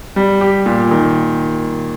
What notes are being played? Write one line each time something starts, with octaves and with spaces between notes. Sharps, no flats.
G3
G4
A#2
D#3